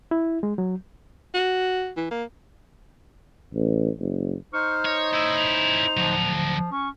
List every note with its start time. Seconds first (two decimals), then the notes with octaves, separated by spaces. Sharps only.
0.11 E4
0.43 G#3
0.58 F#3
1.34 F#4
1.97 E3
2.11 A#3
3.54 A1
4.00 F#1
4.53 D#4 C5 C#6 F6
4.86 C#5 D#5
5.14 C#4 E4 E6
5.37 F7
5.97 D2 F3 F#3
6.72 C#4 C#6